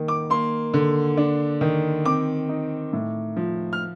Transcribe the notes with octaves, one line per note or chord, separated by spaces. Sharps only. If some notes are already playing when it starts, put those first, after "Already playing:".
Already playing: D#3 A#3
D6
A#3 C6
D3
D4
D#3
C4 D6
D#4
A2
F3
F6